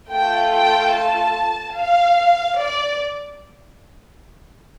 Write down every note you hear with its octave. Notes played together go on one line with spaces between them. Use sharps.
A3 F4 A4 G5
G5
A5
F5
D5